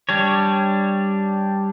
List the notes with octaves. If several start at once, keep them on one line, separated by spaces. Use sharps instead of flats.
G3 D4 C#5